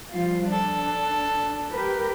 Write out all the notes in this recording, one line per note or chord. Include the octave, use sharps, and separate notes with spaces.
F3 G3 F4
D4 A4
G4 A#4 B4